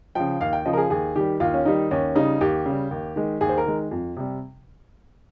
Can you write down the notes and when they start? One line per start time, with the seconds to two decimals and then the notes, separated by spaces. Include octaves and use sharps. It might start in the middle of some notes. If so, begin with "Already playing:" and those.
0.15 C#3 F3 G5
0.41 D#2 F5
0.53 G5
0.65 C#3 F3 D#5
0.73 A#4
0.77 G#4
0.90 D#2 G#4
1.15 D#3 G3 G4
1.40 D#2 F4
1.54 C#4
1.65 D#3 G3 D#4
1.91 D#2 C#4
2.15 C#3 G3 D#4
2.41 D#2 G4
2.66 C#3 G3
2.91 D#2
3.16 D#3 G#3
3.41 D#2 G#4
3.49 C5
3.58 A#4
3.66 D#3 G#3
3.91 F2
4.16 C3 G3